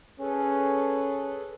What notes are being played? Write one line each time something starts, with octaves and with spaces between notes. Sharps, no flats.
C#4 G#4 A4 B4